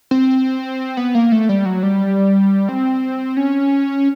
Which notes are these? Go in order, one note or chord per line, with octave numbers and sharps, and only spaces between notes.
C4
B3
A#3
A3
G3
F#3
G3
C4
C#4